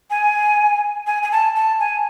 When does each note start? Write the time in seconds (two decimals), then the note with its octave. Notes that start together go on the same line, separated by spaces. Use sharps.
0.10 G#5
1.07 G#5
1.23 G#5
1.32 A5
1.56 A5
1.80 G#5